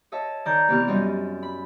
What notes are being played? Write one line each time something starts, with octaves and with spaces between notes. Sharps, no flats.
C#5 D#5 E5 A5
D#3 D5 A#5 G6
E2 C3 B3 C4 G4 F6
F#2 G3 D#5 C6
B5